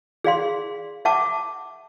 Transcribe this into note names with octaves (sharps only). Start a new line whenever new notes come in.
G#4 D5 F5 C6
E5 F#5 A5 C#6 D6